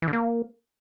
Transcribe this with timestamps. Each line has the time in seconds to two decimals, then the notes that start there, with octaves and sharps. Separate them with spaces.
0.02 E3
0.08 D3
0.13 A#3